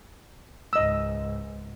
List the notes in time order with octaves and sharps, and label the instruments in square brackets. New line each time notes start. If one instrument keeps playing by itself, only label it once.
[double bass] C#2 G#2 [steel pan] D#5 E6